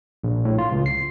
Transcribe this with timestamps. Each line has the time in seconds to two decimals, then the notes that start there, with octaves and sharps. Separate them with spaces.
0.24 A#1
0.45 A2
0.58 F4
0.72 C#2
0.86 C7